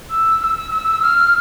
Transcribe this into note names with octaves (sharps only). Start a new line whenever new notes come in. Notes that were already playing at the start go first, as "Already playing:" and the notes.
E6
F6
E6
E6
F6